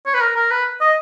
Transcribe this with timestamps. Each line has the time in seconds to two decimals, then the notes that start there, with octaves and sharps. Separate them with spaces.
0.06 C#5
0.14 B4
0.21 A#4
0.36 A#4
0.51 B4
0.81 D#5